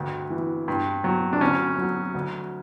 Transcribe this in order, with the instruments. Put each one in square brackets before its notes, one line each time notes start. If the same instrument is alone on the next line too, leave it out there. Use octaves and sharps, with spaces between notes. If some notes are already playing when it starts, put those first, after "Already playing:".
Already playing: [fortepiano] D2 G2
E3
G2
F#3
D4
D2 C#4
F#3
D2